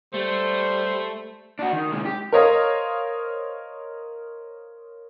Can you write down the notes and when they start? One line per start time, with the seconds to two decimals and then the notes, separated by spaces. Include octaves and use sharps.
0.14 G3 A3 C5
1.59 D4 F#4
1.72 D#3
1.93 C3 G#3
2.05 G4
2.32 A#4 C5 C#5 D#5 F5